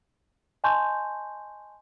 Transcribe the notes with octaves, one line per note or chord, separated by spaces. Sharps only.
D#5 G#5 A5 C6 C#6 G6